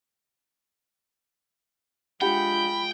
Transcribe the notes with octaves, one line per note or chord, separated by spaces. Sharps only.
G#3 D4 F4 G4 F#5 G5 B5